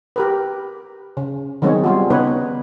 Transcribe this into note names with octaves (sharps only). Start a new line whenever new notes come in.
G4 A#4 B4
C#3
D#3 F#3 G#3 B3 C4 C#5
G3 F4 F#4
C#3 B3 D#4 B4 C#5